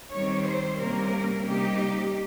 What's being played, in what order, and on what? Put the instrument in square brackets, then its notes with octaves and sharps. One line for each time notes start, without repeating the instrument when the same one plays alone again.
[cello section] D#3 G3 C4 C#5
C5
C3 G3 A#3 C#4 A#4
C3 G3 A#3 D#4 G4